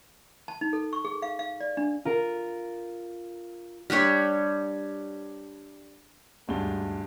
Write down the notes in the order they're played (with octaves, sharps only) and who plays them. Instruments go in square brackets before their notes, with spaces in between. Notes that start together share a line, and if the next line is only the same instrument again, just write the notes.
[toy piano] A5
D#4
A4
C#6
G#4
F5
F5
D5
D4
[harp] F4 A#4
[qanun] G3 D4 G4 C#5
[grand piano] D#1 D2 G2 G#3 G7